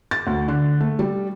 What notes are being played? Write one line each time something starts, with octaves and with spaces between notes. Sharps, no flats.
A6
D2
D3
A3
G3